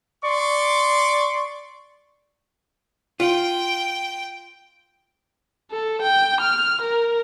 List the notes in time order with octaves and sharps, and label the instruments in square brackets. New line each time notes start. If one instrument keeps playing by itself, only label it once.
[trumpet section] D5 C6 C#6
[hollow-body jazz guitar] F4 [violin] G5
[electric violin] A4
G5
F6
A#4